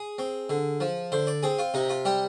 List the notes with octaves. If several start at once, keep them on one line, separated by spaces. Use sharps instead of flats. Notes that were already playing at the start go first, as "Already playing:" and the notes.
Already playing: G#4
C4
D3
F3
D3 C5
D5
C4 G#4
F4
C3 D#4
F4
G3 G4